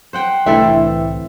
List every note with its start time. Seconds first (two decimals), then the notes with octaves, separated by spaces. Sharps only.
0.13 C5 F#5 G5
0.46 C2 A2 D3 E3 C4 E4 A4 E5